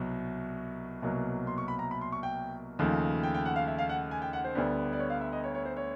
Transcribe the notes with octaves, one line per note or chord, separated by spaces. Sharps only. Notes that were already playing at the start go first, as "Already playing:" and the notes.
Already playing: C2 B2 F#3
C2 B2 F#3 A#3
C6
C#6
B5
A#5
B5
C6
C#6
G5
D#2 C#3 F3 A3
G5
G5
F#5
F5
E5
F5
F#5
G#5
G5
F#5
C5
D2 D3 G3 B3 D4
D5
C#5
F5
E5
D#5
C#5
C#5
C5
C#5